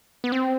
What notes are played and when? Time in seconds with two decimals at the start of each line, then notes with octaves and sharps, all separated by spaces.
0.24 B3
0.32 C4